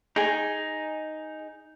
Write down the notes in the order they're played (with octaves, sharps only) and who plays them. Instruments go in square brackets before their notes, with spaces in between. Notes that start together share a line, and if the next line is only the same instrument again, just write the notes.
[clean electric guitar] D#4 [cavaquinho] G#4 G#5